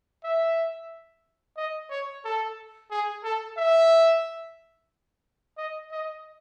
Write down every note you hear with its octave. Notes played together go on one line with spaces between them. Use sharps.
E5
D#5
C#5
A4
G#4
A4
E5
D#5
D#5